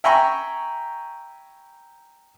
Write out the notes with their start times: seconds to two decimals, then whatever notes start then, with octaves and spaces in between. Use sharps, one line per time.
0.04 E5 G5 G#5 A#5 B5 C#6